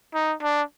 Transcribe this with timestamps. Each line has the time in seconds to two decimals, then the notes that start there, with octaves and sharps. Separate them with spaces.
0.14 D#4
0.42 D4